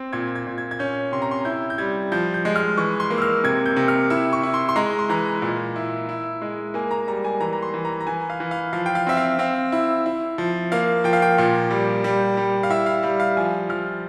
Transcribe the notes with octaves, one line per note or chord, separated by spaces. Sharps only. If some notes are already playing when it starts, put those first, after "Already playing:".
Already playing: C4
A#2 G#6
G#6
A#2
G#6
G#6
C#4 G6
C3 C6
A#5
C6
E4 G6
G6
G3 G#6
F3 G6
G6
G#3
F6
E3 C#6
C6
A#3
E6
F6
C3 G#6
G6
C3
F6
E4 E6
C#6
E4
C6
C6
G#3 A#5
C6
E3 A#5
A#2
E4
E4
G#3
A#3 G#5
A#5
G3 A#5
G#5
E3 A#5
A#5
C6
E3
A#5
A#5
E3 G#5
F5
E3
F5
F3 F5
G5
F5
C4 E5
F5
C4 F5
E4
E4
F3
A#3 F5
F3 G5
F5
G5
A#2
G3
G3
G3
F5
E4 E5
F5
G3 F5
F5
F3 G#5
F3 F6